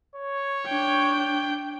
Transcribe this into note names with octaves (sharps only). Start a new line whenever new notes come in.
C#5
D4 G5